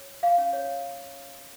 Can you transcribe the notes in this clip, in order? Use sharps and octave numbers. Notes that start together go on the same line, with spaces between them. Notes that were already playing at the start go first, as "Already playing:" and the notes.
Already playing: C#5
F5
C#4
C#5